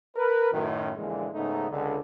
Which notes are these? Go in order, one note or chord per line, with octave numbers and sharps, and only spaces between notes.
A#4 B4
F#2 A2 D#3
A#1 F2 A#2 D3 E3 G#3
G#2 C#3 A3 B3 D#4
C#2 D3